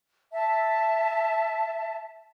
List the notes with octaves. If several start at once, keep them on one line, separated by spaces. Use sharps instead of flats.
E5 A5